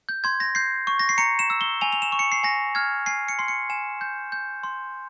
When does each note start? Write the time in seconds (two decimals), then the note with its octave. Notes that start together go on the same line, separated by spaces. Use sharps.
0.09 G6
0.24 C6 G#6
0.40 A#6
0.55 G6 C7
0.87 C#6
0.99 A#6
1.09 C7
1.18 A#5 C#7
1.39 E7
1.50 E6
1.61 G7
1.81 G#5 F7
1.93 F7
2.02 E7
2.12 C#6
2.19 C#7
2.32 C7
2.43 G#5 A#6
2.75 F6 G#6
3.06 G#5 C7
3.28 C#7
3.39 C6 C7
3.48 C#7
3.70 G#5 E7
4.01 G6
4.32 G6
4.63 C6